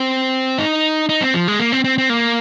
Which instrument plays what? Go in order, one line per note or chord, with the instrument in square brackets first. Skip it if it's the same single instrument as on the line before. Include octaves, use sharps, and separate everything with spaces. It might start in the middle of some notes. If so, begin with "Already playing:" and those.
Already playing: [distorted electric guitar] C4
D#4
D#4
C4
F3
G#3
A#3
C4
C4
C4
A#3